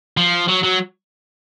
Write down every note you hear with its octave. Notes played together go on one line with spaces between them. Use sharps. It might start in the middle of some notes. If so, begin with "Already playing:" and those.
F3
F#3
F#3